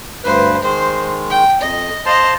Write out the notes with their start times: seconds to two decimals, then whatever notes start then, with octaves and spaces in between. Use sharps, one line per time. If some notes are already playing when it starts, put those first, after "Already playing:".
0.24 D2 G2 B4 C5
0.62 D#3 G#3 C5
1.30 G5
1.61 F2 D#5
2.06 C5 D#5 F5 A5 C6